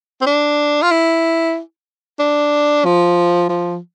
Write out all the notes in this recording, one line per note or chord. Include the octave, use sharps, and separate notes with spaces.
C4
D4
F4
E4
D4
F3
F3